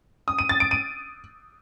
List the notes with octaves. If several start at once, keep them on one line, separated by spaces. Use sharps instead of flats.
D#6
D#7
A6
D7
D#7